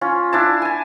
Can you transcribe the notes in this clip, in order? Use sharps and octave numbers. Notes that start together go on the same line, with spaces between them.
C#4 F4
D4 E4 A5
G#5 A5